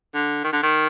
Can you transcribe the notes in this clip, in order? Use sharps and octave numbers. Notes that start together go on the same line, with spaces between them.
D3
D#3
D3
D#3